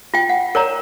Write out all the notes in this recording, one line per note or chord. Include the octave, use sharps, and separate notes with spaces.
F4 G5
F#5
A#4 C#5 D5 A#5